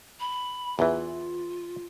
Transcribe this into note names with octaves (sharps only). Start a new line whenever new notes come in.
B5
E2 E3 F4